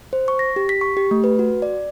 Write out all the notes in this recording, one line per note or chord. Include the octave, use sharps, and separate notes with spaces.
C5
C#6
A#6
G4
B6
C#6
G4
A3
B4
F#4
D5